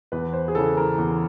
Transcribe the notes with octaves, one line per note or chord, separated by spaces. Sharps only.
E2 B4
C5
G#4
C#3 E3 A4
A#4
E2